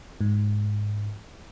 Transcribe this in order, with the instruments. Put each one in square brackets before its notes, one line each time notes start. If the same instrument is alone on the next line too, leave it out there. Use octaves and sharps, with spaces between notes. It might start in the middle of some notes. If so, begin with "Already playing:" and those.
[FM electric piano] G#2